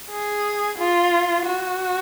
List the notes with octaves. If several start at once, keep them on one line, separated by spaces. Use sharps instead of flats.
G#4
F4
F#4